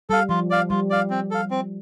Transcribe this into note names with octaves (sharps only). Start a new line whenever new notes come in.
G3 A4 F5
F3 F4
D5 F5
G3 F4
D5 F5
C4
A4 F5
C4